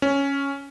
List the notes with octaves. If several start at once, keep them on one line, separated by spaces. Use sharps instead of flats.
C#4